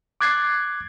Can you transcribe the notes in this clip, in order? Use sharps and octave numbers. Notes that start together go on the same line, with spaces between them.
D6 F#6 G#6 A6 C7